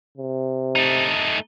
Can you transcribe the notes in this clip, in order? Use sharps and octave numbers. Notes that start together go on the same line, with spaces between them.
C3
A3 D#4